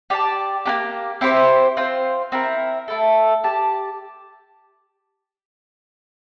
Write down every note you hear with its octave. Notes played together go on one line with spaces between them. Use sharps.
G4 D5 F5 A5
A#3 D4 G4
C4 E4 G4 C5
C4 F4 C5
C4 E4 A#4
A3 E4 A4
G4 D5 A5